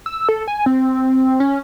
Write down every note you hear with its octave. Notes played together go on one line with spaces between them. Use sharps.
E6
A4
G#5
C4
C#4